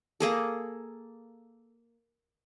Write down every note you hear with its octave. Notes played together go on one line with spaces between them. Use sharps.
A#3 G#4 A4